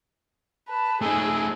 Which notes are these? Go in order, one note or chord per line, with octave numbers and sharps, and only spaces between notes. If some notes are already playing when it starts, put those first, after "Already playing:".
B4 A5
A3 D#4 G#4 E6